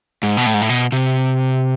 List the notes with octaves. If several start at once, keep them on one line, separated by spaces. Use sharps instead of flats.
G#2
B2
A2
G#2
A2
B2
C3